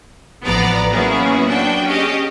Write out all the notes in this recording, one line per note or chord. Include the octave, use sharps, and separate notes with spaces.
A1 F3 B3 D5 A#5
F#3 A#3 B3 C#4 E4 G#4
D4 F#4 G5
C#4 G4 G#4 D#5